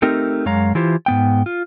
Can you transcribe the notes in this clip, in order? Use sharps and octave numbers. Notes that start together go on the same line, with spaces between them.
A3 C4 D#4 G4 A#4
F#2 G#3 C#5 F5 A#5
E3 E4 F4 G4 C5
G#2 B3 G5
F4